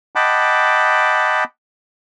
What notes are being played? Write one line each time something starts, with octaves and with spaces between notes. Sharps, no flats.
D#5 F#5 G5 A5 B5 D6